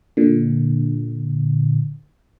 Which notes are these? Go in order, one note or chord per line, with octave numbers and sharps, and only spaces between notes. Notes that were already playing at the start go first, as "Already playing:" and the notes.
A#2 D3